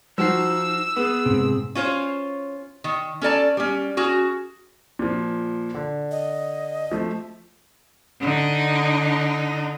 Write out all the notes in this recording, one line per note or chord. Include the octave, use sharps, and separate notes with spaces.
F3 D#4 F#4 E6 C7
B3 G#4
G#2 C3
C#4 F4 C5 C#5
D#3
C#4 A4 D5 A5
G3 C#4
C#4 F#4 G#4
A#2 F3
D3
D#5
F3 A3
D3 D#4